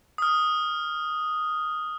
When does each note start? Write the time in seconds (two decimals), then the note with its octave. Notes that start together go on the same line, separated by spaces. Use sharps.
0.18 D#6 F6